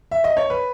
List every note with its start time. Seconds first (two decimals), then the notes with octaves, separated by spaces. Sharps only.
0.11 E5
0.24 D#5
0.37 C#5
0.50 B4